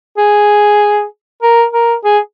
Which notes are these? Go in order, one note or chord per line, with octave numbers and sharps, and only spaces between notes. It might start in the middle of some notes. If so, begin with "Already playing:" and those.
G#4
A#4
A#4
G#4